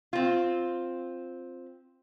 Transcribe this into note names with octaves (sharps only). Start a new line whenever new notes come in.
C4 F4